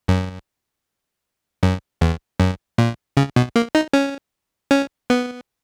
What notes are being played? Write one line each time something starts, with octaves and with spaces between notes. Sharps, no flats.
F#2
F#2
E2
F#2
A#2
C#3
B2
A#3
D#4
C#4
C#4
B3